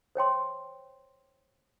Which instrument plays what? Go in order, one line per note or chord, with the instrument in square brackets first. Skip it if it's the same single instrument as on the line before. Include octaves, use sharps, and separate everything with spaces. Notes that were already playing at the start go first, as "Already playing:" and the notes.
[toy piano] C5 C#5 G5 C6